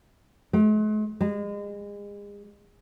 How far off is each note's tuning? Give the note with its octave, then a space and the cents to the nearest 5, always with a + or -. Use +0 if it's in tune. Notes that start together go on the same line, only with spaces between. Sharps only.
G#3 +45
G#3 -35